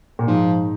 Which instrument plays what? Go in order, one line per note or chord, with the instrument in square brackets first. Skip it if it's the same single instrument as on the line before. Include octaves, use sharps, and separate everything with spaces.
[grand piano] A#2
[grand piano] G#2 [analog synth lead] F3